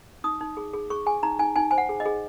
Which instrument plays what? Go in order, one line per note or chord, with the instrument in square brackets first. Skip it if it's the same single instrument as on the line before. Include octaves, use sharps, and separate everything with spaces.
[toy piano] D#4 D#6
D#4
G#4
G#4
G#4 C#6
G#4 G#5
D#4 A#5
D#4 G#5
D#4 G#5
C5 G#5
F#5
G#4
D#5
G#4